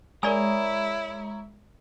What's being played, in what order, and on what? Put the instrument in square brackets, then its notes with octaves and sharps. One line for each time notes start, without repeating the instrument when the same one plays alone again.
[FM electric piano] G#3 [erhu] E4 [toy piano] A#4 D5 G#5 [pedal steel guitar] C#5 A#5 D#6